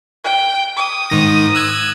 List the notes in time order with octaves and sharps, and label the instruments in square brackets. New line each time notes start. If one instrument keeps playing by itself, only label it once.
[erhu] G5
D#6
[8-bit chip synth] G#2 D#3 A#6
E6 F#6 G#6